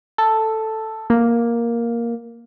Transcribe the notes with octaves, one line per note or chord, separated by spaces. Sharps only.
A4
A#3